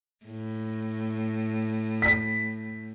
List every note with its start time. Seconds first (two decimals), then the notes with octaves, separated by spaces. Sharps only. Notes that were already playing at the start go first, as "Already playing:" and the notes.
0.26 A2
2.02 B6